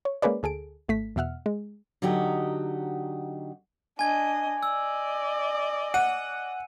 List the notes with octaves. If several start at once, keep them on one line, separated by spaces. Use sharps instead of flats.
C#5
G#3 A#3 C#4 G#4 B4 D5
D2 G#4 A4 D7
G#1 A3 B6
E2 B2 E5 F#5 F6
G#3
D3 F#3 D#4 F#4 G4 D#5
D4 D#5 G#5 G#6
D5 D#5 E6
F#5 D#7